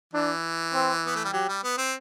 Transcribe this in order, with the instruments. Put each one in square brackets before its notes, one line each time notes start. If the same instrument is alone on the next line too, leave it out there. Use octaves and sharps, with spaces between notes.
[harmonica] E3 [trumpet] D4
[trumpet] C4
[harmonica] B3
A3
G3
[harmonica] F#3 [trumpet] G4
[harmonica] G3
B3
C4